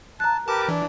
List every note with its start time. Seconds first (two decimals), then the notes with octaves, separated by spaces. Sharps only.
0.20 A5 A#5 F#6
0.48 G4 A#4 B4 A5 D6
0.68 E3 D4